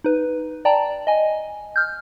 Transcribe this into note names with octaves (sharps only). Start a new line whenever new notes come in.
D#4 B4
D5 G5 A5 A#5
D#5 G#5
F6 G6